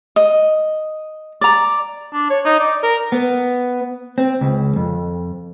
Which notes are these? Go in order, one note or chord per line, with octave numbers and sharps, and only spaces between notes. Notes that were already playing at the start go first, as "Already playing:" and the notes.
D#5
D5 A#5
D4
C#5
D#4
D5
A#4
B3
C4
C#2
F2